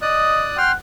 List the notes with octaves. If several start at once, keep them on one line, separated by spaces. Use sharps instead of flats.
D5 D#5 D#6 F#6
F#5 G5 C6 F6